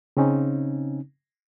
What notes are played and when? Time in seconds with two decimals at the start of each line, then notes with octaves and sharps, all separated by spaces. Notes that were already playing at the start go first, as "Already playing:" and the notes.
0.17 C#3 C4 C#4 D#4